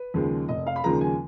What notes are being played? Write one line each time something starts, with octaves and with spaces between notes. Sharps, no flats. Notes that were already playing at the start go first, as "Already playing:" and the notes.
Already playing: B4
D#2 C#3 F3 G#3
F1 D#5
F5
B5
D#2 C#3 F3 G#3 A#5
G#5